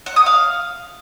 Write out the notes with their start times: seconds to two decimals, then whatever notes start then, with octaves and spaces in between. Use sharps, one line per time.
0.06 F#5
0.16 D#6
0.26 F5